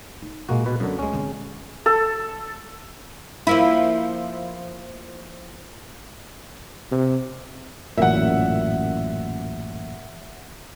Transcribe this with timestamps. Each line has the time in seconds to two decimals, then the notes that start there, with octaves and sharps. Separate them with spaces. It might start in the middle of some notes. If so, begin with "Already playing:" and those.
0.22 D#4
0.49 A#2 G#3 A#3 F#4
0.66 B2 B4
0.80 F#2 D3 F#3 C4
0.99 D2 G#3 C#4
1.13 D3 C4
1.86 A4
3.47 F3 A#3 E4
6.92 C3
7.98 A1 F#2 A#2 E5 F#5